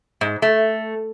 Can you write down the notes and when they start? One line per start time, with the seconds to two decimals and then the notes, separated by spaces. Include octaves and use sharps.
0.21 G#2
0.42 A3